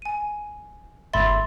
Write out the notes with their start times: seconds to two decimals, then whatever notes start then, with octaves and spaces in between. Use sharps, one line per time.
0.02 G#5 D#7
1.13 G1 G#2 E5 B5 C6 A6